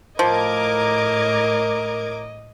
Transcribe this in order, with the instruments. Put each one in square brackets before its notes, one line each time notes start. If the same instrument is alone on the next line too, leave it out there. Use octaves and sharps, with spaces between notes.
[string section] A2 D6 G#6 [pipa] F3 [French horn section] A#4 [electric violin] D#5